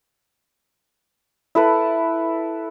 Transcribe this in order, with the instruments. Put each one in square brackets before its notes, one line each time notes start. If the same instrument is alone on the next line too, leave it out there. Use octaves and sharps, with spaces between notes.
[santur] E4 A4 B4